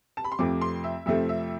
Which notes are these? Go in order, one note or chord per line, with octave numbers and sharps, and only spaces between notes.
A5
B5
C6
F2 C3 F3 A3 C4 D6
C6
E5
F2 C3 F3 A3 C4 E5
E5